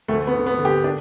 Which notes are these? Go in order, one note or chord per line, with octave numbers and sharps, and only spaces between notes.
D2 A3
B3
D3
B3
D3
G4
D4